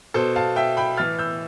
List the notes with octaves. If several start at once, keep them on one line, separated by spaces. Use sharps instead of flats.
B2 A4 C5
F5 A5
E5 G5
G5 B5
A2 E3 F6 A6
E6 G6